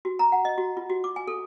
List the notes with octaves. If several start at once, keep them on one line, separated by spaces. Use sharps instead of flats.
F#4
A#5
F#5
D#5
F#4
F4
F#4
D6
G#5
A4